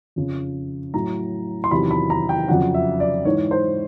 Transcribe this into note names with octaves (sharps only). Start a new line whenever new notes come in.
F2 C#3 F3
A2 F#3 A#5
C6
E2 C3 D#3 F#3 B5
B5
A#5
G5
F2 C#3 F#3 F#5
E5
D5
G#2 E3 C#5
C5